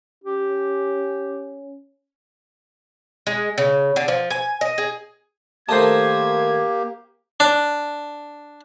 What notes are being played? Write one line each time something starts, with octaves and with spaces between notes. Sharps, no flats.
C#4 G4
G#3
C#3
D3
F3
G#5
D#5
G#4
D#3 A3 A#3 G4 C5 D#5 A5 G#6
D4